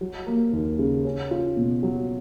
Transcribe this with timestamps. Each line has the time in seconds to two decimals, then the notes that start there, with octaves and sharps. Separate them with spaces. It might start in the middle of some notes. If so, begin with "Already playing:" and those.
0.01 F#3
0.27 A#3
0.53 D#2
0.79 C#3
1.05 C#4
1.31 F4
1.57 B2
1.83 F#3